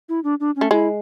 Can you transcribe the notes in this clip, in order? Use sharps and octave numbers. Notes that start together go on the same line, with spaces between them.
E4
D4
D4
C#4
A3
G#3 E4